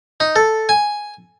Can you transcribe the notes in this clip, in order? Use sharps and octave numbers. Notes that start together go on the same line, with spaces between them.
D#4
A4
G#5